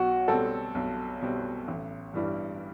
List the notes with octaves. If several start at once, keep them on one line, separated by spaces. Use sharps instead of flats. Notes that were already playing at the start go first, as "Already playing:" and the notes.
Already playing: B1 F#4
B2 G3 C4 A4
B1
B2 G3 C4
A1
G2 E3 G3